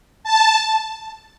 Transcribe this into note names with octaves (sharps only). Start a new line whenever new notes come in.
A5